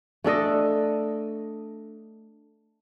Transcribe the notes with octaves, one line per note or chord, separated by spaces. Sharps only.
A3 D4 A4 D#5